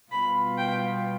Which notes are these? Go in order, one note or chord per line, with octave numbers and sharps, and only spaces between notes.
B2 G3 B3 F4 B5
G5